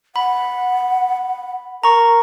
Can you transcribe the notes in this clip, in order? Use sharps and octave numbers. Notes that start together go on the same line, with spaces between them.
F#5 B5
A#4 A#5 C#6